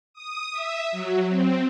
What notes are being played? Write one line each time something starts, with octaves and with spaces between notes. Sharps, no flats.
D#6
E5
F#3
C4